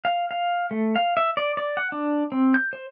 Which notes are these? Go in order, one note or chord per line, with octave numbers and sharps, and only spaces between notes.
F5
F5
A3
F5
E5
D5
D5
F#5
D4
C4
G6
C5